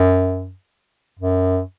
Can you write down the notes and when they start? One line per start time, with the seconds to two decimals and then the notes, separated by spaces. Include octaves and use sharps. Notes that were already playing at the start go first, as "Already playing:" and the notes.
Already playing: F#2
1.19 F#2